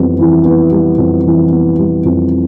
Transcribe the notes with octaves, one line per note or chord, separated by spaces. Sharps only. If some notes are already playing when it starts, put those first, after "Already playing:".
Already playing: F2 E3 G3 B3
E3
B3
G3
F2
E3
B3
G3
F2